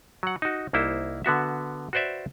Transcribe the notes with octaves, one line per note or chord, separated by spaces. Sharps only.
F#3 F#5
D#4 F#4
C2 A#3 D#4 E4 C5
D3 B3 F#4 E5
F#4 B4 C5 D5 E5